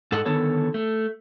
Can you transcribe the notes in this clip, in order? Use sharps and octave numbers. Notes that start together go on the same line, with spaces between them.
G#2 A4 D#5 F#5
D3 D#3 B3 A4 C#5
A3